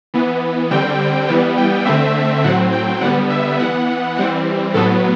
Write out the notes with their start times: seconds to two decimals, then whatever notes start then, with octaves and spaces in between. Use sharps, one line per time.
0.14 E3 B3
0.71 D3 G3 C4 G5
1.28 E3 G3 B3
1.57 G5
1.85 D3 A3 C4 E5
2.44 A2 F#3 C4 F#5
2.72 G5
3.01 D3 G3 B3 F#5
3.30 E5
3.59 E3 B3 F#5
4.16 E3 G3 C4 F#5
4.74 A2 F#3 B3 A4